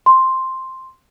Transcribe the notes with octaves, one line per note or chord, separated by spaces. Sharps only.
C6